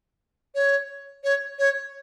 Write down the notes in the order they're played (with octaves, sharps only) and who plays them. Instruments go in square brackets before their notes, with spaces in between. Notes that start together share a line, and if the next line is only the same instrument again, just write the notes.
[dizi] C#5
C#5
C#5